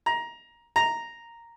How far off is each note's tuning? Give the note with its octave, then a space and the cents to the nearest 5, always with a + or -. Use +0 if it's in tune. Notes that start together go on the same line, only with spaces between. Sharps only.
A#5 +15
A#5 -5